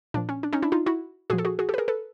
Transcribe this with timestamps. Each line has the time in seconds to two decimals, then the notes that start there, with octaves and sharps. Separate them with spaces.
0.14 A#2 F3 D4
0.29 C#4
0.43 D4
0.53 C#4 D#4
0.62 D4 E4
0.72 D#4 F4
0.86 E4 F#4
1.30 A#2 F3 F#4 G#4
1.38 A4
1.45 F#4 G#4
1.59 F#4 G#4
1.69 G4 A4
1.74 B4
1.78 G#4 A#4
1.88 A4 B4